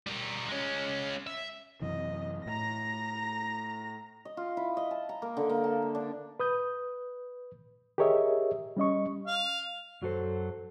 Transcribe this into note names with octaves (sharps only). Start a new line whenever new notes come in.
G3 A#4
G#3 C#4
E5
F#2 C3 E3 D#5
A2 A#5 A#6
D#5
F4
E4
D#5
A5
A#5
A#3
D3
A#3
A5
A#3
D4
B4 D#6 G6
G4 G#4 A#4 C#5 D#5 E5
G3 C#4 D#5 C#6
F5
F#2 F#3 F#4 A4 C5